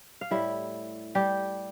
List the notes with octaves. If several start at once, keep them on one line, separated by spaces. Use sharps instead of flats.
F5
A2 G3 E4 E5
G3 G4